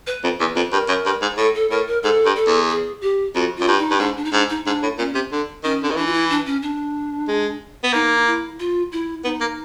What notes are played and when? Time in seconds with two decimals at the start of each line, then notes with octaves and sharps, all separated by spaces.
0.07 B4
0.24 F2
0.40 E2 B4
0.56 F2
0.72 G2 A#4
0.88 F#2
1.05 G2
1.21 G#2
1.37 A2 A4
1.55 A4
1.71 A2 A#4
1.87 A#4
2.03 G#2 A4
2.25 G2
2.36 A4
2.47 E2
2.69 G#4
3.01 G4
3.35 F2 F#4
3.56 F#2 F4
3.68 G2
3.78 D#4
3.91 G2
4.00 G#2 D4
4.17 D4
4.25 D#4
4.33 G#2 D4
4.49 D#4
4.66 G#2 D4
4.83 A2
4.98 A#2 C#4
5.15 C3
5.32 D3
5.64 D#3 C#4
5.83 D3
5.90 D#3
5.96 E3 D4
6.07 F4
6.13 E4
6.30 D4
6.46 C#4
6.62 D4
7.28 G#3
7.83 B3
7.93 A#3 D#4
8.26 E4
8.59 F4
8.92 E4
9.24 B3 D#4
9.40 A#3